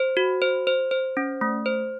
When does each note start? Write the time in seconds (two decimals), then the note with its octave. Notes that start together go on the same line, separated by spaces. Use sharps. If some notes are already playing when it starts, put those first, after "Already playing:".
Already playing: C5
0.17 F#4
0.42 C5
0.67 C5
0.91 C5
1.17 C#4
1.41 A3
1.66 C5